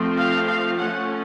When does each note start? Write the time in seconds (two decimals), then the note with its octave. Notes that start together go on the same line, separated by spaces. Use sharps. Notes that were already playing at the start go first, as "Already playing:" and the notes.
Already playing: F3 A3 C4
0.17 F5
0.47 F5
0.77 F3 A3 C#4 F#5